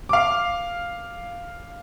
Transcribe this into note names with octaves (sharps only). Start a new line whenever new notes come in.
F5 D6